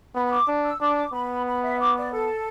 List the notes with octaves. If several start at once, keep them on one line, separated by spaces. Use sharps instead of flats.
B3 B5
B5
D6
D4
E6
D4 D6
B3 B5
B5
E5
D6
D5
A4